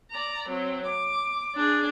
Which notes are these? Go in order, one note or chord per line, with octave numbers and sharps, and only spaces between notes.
D5 A#5
F#3 C4
D6
D4 G#4